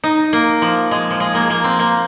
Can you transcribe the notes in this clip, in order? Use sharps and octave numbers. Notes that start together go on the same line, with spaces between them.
D#4
A#3
F3
G#3
F3
G#3
A#3
A#3
C4
A#3